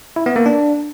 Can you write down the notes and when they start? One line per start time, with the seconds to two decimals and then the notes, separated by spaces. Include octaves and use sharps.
0.16 E4
0.26 B3
0.36 A#3
0.46 D4